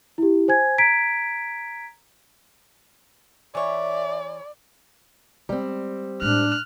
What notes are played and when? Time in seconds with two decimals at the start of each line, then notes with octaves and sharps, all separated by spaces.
0.18 E4 G4
0.48 C5 G#5 G#6
0.78 A#5 G#6 B6 D7
3.55 E3 C#5 D5 E5
5.49 G3 G#3 C4
6.22 A2 G#3 D4 F6 F#6